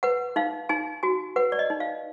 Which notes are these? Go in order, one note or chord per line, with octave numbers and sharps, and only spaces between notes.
B4 F#5
D#4 F5
D#4 G#5
F#4 G#5
B4 F#5
D5
D#5
D#4
F5